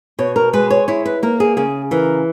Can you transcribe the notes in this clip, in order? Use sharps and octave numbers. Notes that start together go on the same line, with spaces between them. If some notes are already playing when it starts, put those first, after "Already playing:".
B2 C#5
A#4
G#3 B4
C#5
E4 C#5
B4
A#3 A#4
G#4
C#3 G#4
E3 A#4